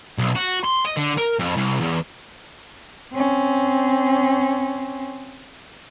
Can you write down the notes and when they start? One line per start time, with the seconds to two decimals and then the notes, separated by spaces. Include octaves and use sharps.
0.18 B1
0.36 F#4
0.64 C6
0.85 D#5
0.97 D3
1.18 A#4
1.40 F2
1.57 C2
1.81 E2
3.14 C4 C#4